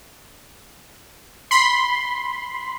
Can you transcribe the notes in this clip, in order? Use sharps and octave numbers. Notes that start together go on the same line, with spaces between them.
B5 C6